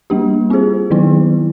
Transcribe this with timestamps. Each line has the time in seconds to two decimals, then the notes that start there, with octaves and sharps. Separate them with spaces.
0.10 G3 A#3 D4 G4
0.50 C4 F4 G#4 C5
0.91 D#3 F#3 B3 E4